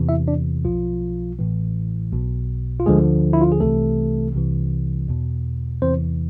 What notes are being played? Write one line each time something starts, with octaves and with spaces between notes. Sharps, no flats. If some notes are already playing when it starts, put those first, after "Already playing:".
Already playing: E2 C3 E3
E4 E5
D4 D5
B1 B2 F3 F4
A1 A2 E3
B1 B2
F4
D2 D3 F3 G#3 G#4
E4
F4
G#4
C2 C3 E3 A3 A4
C2 C3 E3
E2 B2
E2 C3 E3 C4 C5